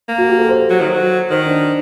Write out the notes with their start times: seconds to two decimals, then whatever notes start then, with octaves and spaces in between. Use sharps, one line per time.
0.08 A#3
0.18 F#4
0.29 G4
0.39 A4
0.49 C5
0.60 C5
0.70 F#3
0.80 D#3
0.90 F#3
1.30 D#3 C5
1.46 D4